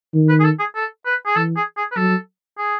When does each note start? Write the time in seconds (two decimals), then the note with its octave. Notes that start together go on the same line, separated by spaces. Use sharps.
0.14 D#3
0.29 B4
0.40 G#4
0.44 A4
0.59 G#4
0.75 A4
1.06 B4
1.26 G#4
1.36 E3 A4
1.56 G#4
1.77 G#4
1.92 B4
1.96 F#3 A4
2.58 G#4